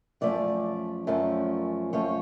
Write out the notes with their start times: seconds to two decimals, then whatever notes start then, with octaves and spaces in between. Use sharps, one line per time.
0.21 F#2 F3 A3 C#4 D5
1.07 F#2 F3 A3 C#4
1.93 F#2 F3 A3 C#4 C#5